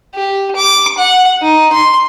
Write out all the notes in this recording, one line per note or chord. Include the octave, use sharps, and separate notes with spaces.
G4
D6
F#5
D#4
C6